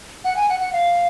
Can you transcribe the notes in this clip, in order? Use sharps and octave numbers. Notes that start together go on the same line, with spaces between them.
F#5
G#5
F#5
F#5
F5